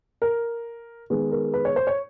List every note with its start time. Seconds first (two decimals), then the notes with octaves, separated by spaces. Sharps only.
0.22 A#4
1.10 D#3 G#3 B3
1.31 A#4
1.54 B4
1.65 C#5
1.76 C5
1.87 C#5